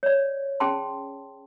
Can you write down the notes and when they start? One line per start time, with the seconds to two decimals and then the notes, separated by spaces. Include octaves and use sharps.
0.03 C#5 D5
0.60 C#4 G#4 G5 A5 C6